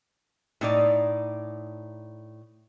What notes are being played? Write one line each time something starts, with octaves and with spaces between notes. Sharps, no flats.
A2 D#4 D5